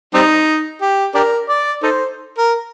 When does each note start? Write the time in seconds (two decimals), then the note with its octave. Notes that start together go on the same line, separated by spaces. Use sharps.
0.14 G3 C4 D#4
0.81 G4
1.15 D4 G4 A#4
1.49 D5
1.83 D#4 A4 C5
2.38 A#4